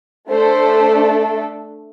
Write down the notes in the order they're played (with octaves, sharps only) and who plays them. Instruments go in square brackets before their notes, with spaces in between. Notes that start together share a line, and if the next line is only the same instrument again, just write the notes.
[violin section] A3 D4 A4 C5